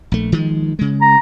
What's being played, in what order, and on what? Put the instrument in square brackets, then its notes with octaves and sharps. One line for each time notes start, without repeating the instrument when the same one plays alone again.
[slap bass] A#1 A3
D#3 F3 G#3
C#3 G#3
[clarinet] A#5